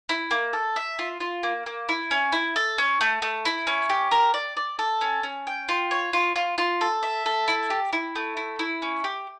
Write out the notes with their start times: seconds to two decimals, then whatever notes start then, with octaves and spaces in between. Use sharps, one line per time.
0.09 E4
0.31 A#3
0.53 A4
0.76 E5
0.99 F4
1.20 F4
1.43 A#3
1.66 A#3
1.89 E4
2.11 C#4
2.32 E4
2.56 A4
2.78 C#4
3.01 A3
3.22 A3
3.45 E4
3.67 C#4
3.90 G4
4.11 A#4
4.34 D5
4.57 D5
4.79 A4
5.01 C#4
5.23 C#4
5.47 G5
5.69 F4
5.91 C#5
6.13 F4
6.36 F4
6.58 F4
6.81 A4
7.03 E5
7.26 A4
7.48 E4
7.70 G4
7.93 E4
8.16 A3
8.37 E4
8.59 E4
8.82 C#4
9.04 G4